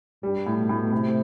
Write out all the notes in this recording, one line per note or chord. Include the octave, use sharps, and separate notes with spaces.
G2 G3
A2
B2
A2
A2 C3